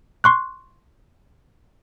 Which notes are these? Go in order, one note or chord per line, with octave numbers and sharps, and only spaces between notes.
C6 C#6 F#6